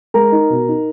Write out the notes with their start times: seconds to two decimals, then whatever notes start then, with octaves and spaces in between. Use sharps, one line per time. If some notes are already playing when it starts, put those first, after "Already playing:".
0.14 G#3 A#4 A#5
0.32 D#4
0.50 B2
0.68 D#4